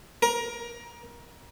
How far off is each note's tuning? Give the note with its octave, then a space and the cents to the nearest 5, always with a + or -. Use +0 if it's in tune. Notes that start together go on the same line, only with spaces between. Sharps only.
A#4 +25